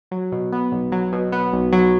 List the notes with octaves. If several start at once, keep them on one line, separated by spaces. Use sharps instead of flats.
F#3
B2
B3
B1
F#3
B2
B3
B1
F#3